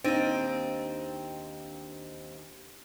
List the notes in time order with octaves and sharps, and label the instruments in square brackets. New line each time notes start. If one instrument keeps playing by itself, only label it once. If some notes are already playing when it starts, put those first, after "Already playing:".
[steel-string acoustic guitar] D#2 C4 [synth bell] D4 D#4